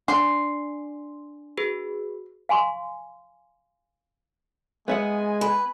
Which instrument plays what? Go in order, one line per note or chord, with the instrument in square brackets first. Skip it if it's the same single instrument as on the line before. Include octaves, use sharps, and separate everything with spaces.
[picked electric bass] D4 [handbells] G#5 D6 [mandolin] C6
[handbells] F#4 G#4 B4
[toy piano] F5 G#5 C6 C#6
[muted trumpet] G#3 [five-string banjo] B3 E5 F#5 [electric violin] G#5
[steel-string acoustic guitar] B4